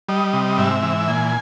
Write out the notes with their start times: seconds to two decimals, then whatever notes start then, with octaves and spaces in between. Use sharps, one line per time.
0.09 G3 D#5
0.33 C3
0.58 G#2 E5
0.83 E3
1.08 A#2 G#5